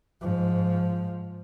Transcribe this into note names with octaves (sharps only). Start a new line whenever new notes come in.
G#2 F3